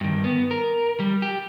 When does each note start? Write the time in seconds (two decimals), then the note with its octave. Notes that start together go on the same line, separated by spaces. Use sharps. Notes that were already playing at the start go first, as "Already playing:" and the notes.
0.01 G2 D#3
0.24 B3
0.51 A#4
1.00 G3
1.22 G4